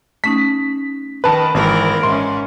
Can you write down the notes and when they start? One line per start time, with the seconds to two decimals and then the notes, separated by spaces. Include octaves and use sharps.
0.24 A3 C#4 D#4 B6
1.24 D#3 B4 A5
1.54 G#1 E3 E4 A#4
2.03 G#2 C#4 E5 C6